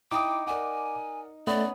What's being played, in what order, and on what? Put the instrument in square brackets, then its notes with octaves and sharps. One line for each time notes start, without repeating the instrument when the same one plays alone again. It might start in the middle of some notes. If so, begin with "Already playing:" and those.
[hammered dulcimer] D#4 [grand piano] E4 D#6 [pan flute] G5 [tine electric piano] D6
[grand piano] A#4 D5 F#5 [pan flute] G#5
[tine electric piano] A3 [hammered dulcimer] B3 [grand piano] C#4 C#5 [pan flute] D5